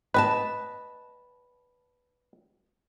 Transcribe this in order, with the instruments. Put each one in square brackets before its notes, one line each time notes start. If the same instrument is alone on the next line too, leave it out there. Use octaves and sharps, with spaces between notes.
[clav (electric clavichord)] B4 [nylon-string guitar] D#5 G#5 A5